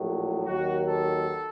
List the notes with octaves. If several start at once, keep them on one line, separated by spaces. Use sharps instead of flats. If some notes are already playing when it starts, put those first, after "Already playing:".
Already playing: A#1 A2 F#3
D#2 D#3 F#3 F#4
A4